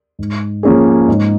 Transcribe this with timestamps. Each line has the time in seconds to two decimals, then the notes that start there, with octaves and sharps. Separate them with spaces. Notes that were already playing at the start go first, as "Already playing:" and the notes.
0.19 G#2
0.63 F3 A#3 C#4 G#4
1.08 G#2